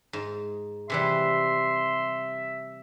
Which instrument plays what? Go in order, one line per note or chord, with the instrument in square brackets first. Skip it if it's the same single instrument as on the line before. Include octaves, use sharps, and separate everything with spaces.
[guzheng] G#2
[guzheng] C3 E3 G3 [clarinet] E5 [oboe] C6